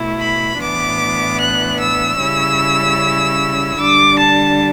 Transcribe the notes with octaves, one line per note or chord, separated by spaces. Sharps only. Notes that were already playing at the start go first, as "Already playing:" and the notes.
Already playing: B2 A3 E4
B5
A2 E3 B3 D4 D6
F#6
E6
C#3 G3 C#4 E4
D3 G3 D4 D6
A5